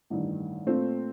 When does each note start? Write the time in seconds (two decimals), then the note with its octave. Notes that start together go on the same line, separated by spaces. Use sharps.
0.10 A1 G2 D#3
0.66 A#2 A3 C4 F4